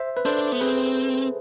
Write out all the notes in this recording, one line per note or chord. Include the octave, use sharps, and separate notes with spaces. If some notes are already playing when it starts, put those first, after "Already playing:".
Already playing: C5 E5
B4
D4 A4 C5
B3
C4 G#4 B4